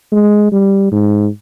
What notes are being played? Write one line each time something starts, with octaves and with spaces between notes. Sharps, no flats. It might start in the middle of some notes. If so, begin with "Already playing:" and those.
G#3
G3
G#2